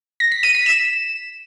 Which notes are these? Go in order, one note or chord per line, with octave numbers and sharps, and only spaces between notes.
A#6
B6
D#7
B6
E7